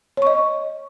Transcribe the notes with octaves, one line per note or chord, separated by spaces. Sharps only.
C#5 D#5 C#6